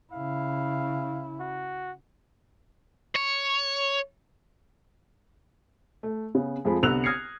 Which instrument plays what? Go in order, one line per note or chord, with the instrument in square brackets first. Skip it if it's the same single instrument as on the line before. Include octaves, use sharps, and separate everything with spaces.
[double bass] C#3 E4 [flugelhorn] F5
[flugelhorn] F#4
[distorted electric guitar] C#5
[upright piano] A3
C#3 B3
F2 F3 G#3 F4 B5
C2 D3 B3 E6 F#6 F7
D#6 F6 G#6 A#6 C7 C#7